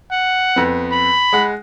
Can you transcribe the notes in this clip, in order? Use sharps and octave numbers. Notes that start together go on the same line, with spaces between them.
F#5
F2 B3
B5
G#3 F#5